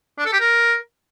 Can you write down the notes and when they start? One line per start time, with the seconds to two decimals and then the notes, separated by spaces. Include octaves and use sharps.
0.18 D4
0.25 A4
0.33 G4
0.40 A#4